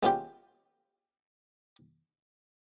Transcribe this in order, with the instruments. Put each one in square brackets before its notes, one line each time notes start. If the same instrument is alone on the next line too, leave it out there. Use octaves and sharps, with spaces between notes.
[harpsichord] G#3 B3 C#4 F4 G4